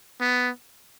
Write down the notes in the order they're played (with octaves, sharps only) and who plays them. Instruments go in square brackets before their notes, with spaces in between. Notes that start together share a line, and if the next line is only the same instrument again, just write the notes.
[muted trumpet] B3